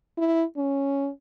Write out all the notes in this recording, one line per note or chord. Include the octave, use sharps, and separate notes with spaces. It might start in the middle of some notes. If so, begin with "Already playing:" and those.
E4
C#4